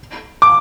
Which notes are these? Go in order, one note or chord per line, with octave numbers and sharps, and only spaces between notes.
D6